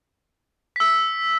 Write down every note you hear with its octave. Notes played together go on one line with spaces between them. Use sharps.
E6 B6